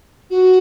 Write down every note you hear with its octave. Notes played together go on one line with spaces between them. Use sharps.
F#4